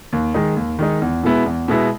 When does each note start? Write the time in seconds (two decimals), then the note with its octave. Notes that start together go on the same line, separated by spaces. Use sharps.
0.13 D#2
0.34 D#3 G#3 D#4
0.56 D#2
0.79 D#3 G#3 D#4
1.02 E2
1.23 B2 G#3 B3 E4
1.46 E2
1.68 B2 G#3 B3 E4